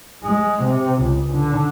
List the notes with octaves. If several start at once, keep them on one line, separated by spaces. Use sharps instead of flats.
G#3
C3
C#2
D3